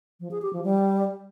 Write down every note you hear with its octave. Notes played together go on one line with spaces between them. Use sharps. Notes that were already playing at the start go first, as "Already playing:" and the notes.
F3
G#4
G4
F3
G3